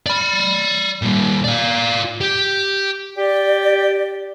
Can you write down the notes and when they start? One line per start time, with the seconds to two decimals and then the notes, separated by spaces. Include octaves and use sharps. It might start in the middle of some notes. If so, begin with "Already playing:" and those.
0.06 D5 B5
1.02 A#2 G3
1.44 F4 D5
2.21 G4
3.17 G4 D5